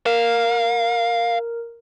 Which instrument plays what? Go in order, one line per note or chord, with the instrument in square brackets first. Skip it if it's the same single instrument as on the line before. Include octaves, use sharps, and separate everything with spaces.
[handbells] A#4 [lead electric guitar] F5